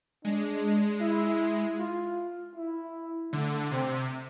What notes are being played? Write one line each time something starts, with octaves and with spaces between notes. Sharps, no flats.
G#3 D4
E4
F4
E4
D3 A3
C3 C4